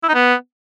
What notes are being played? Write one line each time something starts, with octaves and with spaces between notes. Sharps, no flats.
E4
D#4
B3